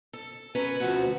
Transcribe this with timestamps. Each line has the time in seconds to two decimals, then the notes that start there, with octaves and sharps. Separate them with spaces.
0.13 A4
0.55 C#4 A#4 B4
0.80 D2 F3 G#3 A3 C4 F#4